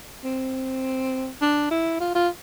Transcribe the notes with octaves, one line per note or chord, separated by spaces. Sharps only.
C4
D4
E4
F4
F4